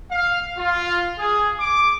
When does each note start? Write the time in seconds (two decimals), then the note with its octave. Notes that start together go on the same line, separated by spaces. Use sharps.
0.11 F5
0.58 F4
1.19 G#4
1.58 D6